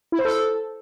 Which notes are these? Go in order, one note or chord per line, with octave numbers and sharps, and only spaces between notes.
E4
C5
A4